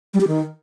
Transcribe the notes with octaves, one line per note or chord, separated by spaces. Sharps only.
G3
G4
D#3